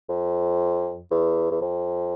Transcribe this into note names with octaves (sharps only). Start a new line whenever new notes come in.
F2
E2
E2
F2